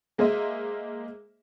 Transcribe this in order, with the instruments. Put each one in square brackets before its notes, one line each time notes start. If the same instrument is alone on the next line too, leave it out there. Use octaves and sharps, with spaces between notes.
[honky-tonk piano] G#3 A#3 G#4 C5 D#5 E5